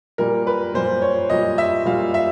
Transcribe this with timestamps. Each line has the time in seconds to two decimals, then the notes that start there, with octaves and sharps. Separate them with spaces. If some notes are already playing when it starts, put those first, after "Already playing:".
0.18 A#2 G3 A#4
0.47 B4
0.74 A#2 G3 C5
1.02 C#5
1.30 A#2 G3 D#5
1.58 E5
1.85 A#2 G3 F5
2.14 E5